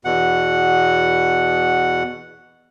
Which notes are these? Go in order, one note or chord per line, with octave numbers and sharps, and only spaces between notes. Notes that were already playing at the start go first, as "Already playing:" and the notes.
E2 B2 F#5